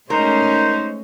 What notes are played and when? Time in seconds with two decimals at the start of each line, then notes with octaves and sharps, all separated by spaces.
0.10 G#3 A3 C#4 D#4 A#4 C5